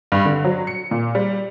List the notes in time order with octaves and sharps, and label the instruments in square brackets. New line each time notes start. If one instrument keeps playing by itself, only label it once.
[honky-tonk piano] G2
D3
F#3
C#7
A#2
G3